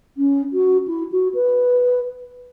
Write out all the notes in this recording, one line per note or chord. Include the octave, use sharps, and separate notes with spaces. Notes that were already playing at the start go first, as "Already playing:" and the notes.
C#4
F#4
E4
F#4
B4